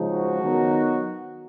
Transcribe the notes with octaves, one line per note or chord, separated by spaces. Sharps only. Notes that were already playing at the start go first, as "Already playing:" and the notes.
Already playing: C#3 F3 G#3 D#4
F#4
D#3 F#3 B3 D#4